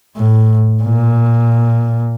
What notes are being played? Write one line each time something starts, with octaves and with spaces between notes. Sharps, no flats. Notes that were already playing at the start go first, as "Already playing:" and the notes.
A2
A#2